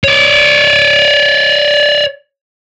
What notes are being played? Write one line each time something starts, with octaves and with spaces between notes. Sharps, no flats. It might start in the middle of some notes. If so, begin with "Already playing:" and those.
C#5 D5